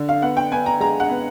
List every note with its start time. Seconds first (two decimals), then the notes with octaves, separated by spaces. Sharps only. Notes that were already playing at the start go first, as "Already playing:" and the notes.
Already playing: D3
0.09 F5
0.22 B3 F#5
0.37 G5
0.52 B3 G#5
0.66 A#5
0.80 G#3 A#5
1.00 F#5
1.09 B3